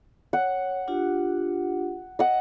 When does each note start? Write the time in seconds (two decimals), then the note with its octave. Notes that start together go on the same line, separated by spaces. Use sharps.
0.33 C#5 F#5
0.88 D4 F4 G4
2.19 D#5 F#5